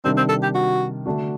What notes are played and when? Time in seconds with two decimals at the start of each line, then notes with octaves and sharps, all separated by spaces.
0.04 C3 D#3 G3 C4 D4
0.17 C4
0.29 A4
0.43 G4
0.55 F#4
1.06 D3 A3 D4 F#4